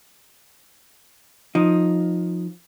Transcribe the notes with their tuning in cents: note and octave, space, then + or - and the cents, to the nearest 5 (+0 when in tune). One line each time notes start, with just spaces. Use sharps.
F3 +15 D#4 +0